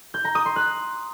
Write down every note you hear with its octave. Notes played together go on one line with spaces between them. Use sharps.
G6
A#5
D#6
C6
F#6